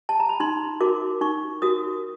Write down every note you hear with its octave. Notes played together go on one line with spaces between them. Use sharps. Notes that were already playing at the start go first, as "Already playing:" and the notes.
A5
A#5
B5
D#4 C6
F#4 A#4 D6
D#4 C#6
F#4 A#4 D#6